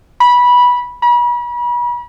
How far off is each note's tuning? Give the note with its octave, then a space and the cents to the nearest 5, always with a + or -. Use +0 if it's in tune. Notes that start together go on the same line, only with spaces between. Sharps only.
B5 -15
B5 -40